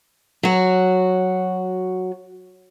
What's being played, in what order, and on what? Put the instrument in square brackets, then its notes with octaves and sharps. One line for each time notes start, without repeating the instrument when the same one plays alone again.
[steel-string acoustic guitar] F#3 F#4